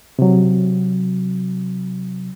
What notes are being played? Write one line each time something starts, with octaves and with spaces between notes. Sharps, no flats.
C3 F#3